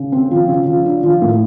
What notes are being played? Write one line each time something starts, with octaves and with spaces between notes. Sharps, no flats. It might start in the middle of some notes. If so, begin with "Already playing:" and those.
Already playing: C#3
C4
F3
C#3
F3
D4
F3
A2